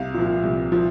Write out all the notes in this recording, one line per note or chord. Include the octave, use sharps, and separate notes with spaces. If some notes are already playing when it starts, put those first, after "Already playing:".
Already playing: C2 F5
A#2 F3
C2
F3